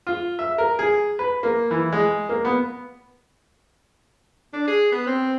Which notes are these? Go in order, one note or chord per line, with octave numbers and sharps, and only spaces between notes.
F4
E5
A#4
G#4
B4
A#3
E3
G#3
A#3
B3
D4
G#4
B3
C4